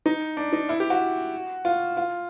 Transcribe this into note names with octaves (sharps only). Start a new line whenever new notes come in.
D#4
D4
D#4
E4
G4
F#4
F4
F4